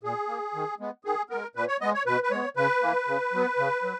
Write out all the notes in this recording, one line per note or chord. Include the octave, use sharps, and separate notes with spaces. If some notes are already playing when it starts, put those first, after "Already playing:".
A#2 G#4
A#3
D#3
G#3 B3
D#3 G#4
G#3 B3 A#4
A#2 B4
C#5
G#3 B3 D#5
C#5
B2 B4
B4
G#3 B3 C#5
C#3 B4
E3 A#3
C#3
F#3 B3
C#3
F#3